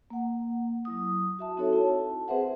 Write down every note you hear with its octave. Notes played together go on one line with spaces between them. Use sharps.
A#3 F#5
F#3 E4 D#6
F#4 E5 A5
C4 D#4 F#4 A4 C#5
E4 A5
C4 G#4 B4 C5 E5 F#5